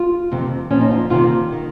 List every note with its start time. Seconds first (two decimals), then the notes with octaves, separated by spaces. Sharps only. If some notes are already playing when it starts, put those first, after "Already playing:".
Already playing: F4
0.32 F2 C3 D#3
0.71 A#2 F3 C#4
0.81 D#4
0.91 F4
1.10 F2 C3 D#3 F4
1.52 D#3